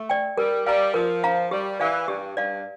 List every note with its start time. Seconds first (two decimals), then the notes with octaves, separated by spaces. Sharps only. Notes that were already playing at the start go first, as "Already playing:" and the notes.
Already playing: A3
0.10 D5 G5
0.38 G3 A#4
0.66 G3 F5 A#5
0.94 F3 A#4
1.24 F5 A#5
1.51 G3 G4
1.80 E3 D5 F5
2.08 G2 G4
2.37 G2 D5 F5